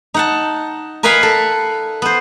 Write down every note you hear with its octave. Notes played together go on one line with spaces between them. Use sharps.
D#4 F#5 A5
A#4 B4 D#5 F5 G#5 B5
A4
B3 C5